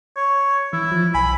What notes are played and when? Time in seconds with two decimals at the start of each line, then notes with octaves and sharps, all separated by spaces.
0.17 C#5
0.73 E3 E4
0.92 F3
1.14 B1 G#5 B5